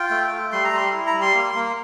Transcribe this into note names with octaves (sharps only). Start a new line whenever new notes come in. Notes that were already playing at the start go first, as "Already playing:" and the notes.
Already playing: F4 G5
A3
A3
G3 C6
A#5
G3 C6
E4
A#5
G3
C6
A#3
A#3